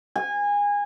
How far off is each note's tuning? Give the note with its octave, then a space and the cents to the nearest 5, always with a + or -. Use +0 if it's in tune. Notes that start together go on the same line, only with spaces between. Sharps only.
G#5 -25